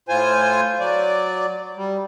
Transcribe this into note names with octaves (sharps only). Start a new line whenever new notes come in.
A2 F4 C5 G#5
F#3 D5
G3